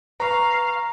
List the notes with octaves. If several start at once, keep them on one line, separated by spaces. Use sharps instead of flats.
B4 F5 A#5 C#6